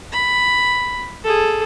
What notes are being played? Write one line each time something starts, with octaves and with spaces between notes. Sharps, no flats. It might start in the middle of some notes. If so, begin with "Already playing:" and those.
B5
G#4 A4